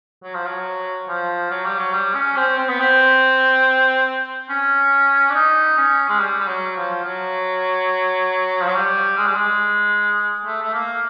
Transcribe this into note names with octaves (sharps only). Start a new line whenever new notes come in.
F#3
F3
F#3
F3
F#3
G3
F#3
G3
C#4
C4
C4
B3
C4
C#4
D4
D#4
C#4
G#3
G3
G3
F#3
F3
F#3
F3
F#3
G3
G#3
G3
G#3
A3
A3
A#3